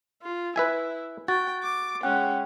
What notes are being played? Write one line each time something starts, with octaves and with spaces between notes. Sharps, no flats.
F4
E4 B4 E5 G#5
F#4 G5 A6
D6
G#3 C#4 F#5 G5 F#6